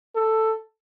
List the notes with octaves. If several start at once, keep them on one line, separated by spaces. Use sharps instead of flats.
A4